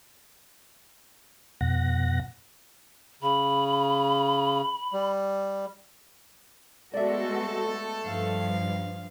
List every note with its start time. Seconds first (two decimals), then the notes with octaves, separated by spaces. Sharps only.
1.61 F2 B2 F#5 A#6
3.22 C#3 B5
4.93 G3
6.94 G#3 A3 B3 F#4 A4 D5 E5
8.04 G2 F3 F5